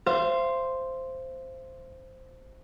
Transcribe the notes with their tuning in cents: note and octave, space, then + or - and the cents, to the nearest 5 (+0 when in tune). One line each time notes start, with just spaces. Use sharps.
C5 +0 F5 -45